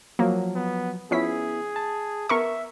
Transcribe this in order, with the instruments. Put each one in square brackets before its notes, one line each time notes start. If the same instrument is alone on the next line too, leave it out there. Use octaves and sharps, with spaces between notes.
[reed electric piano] F3 F#3 [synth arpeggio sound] A#3
[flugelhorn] B3
[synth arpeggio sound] F3 C#4 B6 [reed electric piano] B3 E4 [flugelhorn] G#4
[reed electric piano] A5
[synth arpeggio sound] B3 A#4 C#6 [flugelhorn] E5